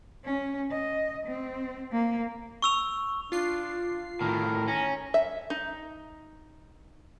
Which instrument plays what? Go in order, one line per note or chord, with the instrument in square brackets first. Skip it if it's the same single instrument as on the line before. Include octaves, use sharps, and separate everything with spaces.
[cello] C#4
D#5
C4
A#3
[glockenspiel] C#6 E6 F7
[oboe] D4 [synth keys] F4 C7
[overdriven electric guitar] A2 D#3 [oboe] A#4
[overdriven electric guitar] C#4 [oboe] A#5
[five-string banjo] E5
D#4